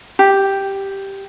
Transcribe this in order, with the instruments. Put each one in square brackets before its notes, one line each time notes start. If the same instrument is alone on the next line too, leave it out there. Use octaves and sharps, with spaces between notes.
[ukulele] G4